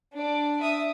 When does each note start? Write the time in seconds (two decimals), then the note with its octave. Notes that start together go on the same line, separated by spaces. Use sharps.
0.14 D4 D5
0.61 E5 D#6